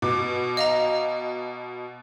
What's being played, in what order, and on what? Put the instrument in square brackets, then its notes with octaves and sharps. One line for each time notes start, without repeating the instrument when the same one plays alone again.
[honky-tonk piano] B2 D6
[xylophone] D#5 F5 A#5